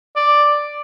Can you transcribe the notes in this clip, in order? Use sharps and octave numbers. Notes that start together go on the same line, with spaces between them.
D5